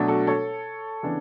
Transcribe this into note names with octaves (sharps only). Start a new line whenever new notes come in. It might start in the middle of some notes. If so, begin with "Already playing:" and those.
Already playing: B2 F#3 A3 D4
F#4 A4
A4 C#5
C#3 E3 B3 D4